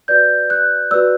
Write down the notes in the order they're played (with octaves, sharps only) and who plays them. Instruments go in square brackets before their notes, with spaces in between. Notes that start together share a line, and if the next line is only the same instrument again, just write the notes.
[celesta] F#4 B4 D5 G6
F#6
F#4 B4 D5 E6